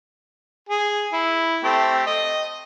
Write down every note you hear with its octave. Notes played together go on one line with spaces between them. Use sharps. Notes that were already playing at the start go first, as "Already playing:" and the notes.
G#4
E4
A3 C4 G4
D#5